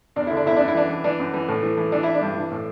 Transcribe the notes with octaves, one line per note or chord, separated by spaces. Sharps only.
E2 D4
D3 E4
D4
E2 E4
F#2 D4
E4
E3 D4
E3
E3 D4
F#2
E3
A2
E3
E3
E3 D4
E3 E4
D4
G2
E3
A2